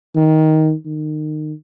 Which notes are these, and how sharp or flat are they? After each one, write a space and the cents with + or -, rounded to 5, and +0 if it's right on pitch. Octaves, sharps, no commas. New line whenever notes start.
D#3 +10
D#3 -25